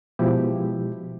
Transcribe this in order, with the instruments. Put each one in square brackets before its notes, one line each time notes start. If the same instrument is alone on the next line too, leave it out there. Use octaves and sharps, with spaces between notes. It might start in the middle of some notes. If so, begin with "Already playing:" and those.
[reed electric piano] B2 F3 G#3 E4 G4